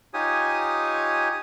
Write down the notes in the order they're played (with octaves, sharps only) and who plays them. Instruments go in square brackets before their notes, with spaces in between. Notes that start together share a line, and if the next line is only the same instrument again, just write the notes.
[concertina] D#4 F4 G4 C#5 G#5 D#6